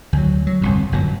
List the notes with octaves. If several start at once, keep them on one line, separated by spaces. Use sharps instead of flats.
D2 F#3
F#3
G1 C2 F2
G1 F#2 A#2